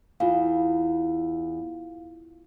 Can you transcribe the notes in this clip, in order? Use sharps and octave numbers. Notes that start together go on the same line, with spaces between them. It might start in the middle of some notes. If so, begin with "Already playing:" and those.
E2 F4 F5